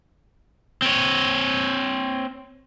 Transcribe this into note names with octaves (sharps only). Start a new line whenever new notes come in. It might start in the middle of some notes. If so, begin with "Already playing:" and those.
C4 C#5